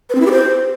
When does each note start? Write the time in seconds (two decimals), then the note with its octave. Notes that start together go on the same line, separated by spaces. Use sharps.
0.09 B4
0.15 C4
0.20 E4
0.26 G4
0.31 C5